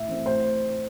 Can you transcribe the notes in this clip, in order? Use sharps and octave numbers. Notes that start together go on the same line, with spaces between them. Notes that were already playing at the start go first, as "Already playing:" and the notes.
Already playing: A2 E5
E3 A3 C4
A2 C5